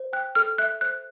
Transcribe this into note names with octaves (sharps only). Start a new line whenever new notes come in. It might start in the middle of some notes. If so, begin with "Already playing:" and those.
Already playing: C5
G5 F#6
A4 F6
E5 F#6
C5 F#6